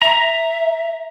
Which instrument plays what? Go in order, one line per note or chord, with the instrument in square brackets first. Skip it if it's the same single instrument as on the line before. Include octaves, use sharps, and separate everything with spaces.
[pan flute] E5 [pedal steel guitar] A#5